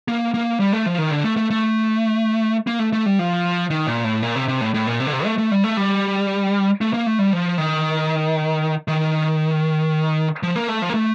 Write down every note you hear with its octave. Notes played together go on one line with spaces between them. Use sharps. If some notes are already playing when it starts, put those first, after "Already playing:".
A#3
A#3
G3
A3
F3
D#3
D3
A3
A3
A3
A#3
A3
A3
G3
F3
D#3
A#2
A2
A#2
C3
C3
A2
A2
A#2
C3
D3
C3
A3
A3
G3
A3
G3
A3
A#3
A3
G3
F3
D#3
D#3
F3
A#3
A3
F3
A#3
A3